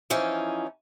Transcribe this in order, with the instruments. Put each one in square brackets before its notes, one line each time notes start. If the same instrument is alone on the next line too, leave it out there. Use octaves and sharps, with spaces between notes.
[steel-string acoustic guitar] E3 F3 C#4 D#4